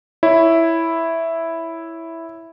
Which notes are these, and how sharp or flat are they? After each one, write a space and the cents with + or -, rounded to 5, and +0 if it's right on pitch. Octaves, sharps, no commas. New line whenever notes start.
E4 +0 C#5 +10